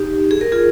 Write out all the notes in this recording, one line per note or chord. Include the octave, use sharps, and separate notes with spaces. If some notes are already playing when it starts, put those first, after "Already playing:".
Already playing: D#4 G4
G#4
A#4
F4 G#4